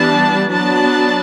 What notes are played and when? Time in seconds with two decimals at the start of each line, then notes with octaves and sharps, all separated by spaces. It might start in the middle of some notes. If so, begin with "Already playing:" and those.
Already playing: E3 G3 B3 D4 A5
0.52 F#3 B3 D4 A5